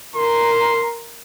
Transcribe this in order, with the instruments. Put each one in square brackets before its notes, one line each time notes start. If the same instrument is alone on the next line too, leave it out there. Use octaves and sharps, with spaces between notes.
[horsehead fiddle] A#4 [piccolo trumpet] C6